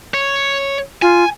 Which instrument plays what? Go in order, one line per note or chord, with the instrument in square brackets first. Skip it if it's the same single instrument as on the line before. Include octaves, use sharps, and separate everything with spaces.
[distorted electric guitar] C#5
[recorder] F4 [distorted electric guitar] G#5